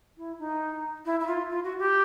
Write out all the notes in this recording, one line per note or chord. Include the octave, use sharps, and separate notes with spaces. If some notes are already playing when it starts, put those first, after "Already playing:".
E4
D#4
E4
E4
F4
F4
F#4
G4